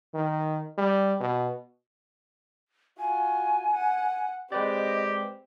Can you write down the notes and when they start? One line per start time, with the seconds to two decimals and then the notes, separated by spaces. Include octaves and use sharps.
0.14 D#3
0.78 G3
1.20 B2
2.99 F4 F#4 G#5
3.71 F#5
4.52 G#3 C4 G4 B4 D5 D#5